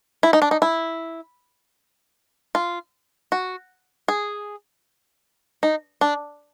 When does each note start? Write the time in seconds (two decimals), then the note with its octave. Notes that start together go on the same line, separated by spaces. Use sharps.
0.23 E4
0.33 D#4
0.42 D4
0.51 D#4
0.62 E4
2.55 F4
3.32 F#4
4.08 G#4
5.63 D#4
6.01 D4